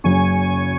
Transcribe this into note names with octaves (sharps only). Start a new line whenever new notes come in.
F#1 F#2 C#3 G#5 C#6